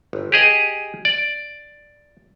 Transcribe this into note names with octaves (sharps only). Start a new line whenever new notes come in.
G1
G4 G#4 D#5
D5